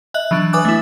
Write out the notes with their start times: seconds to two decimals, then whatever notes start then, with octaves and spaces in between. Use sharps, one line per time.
0.14 D#5 E5 F#6 F#7
0.31 E3 F#3 D4
0.53 B4 E5 G#5 D6 D#6 F#6
0.65 A3 E4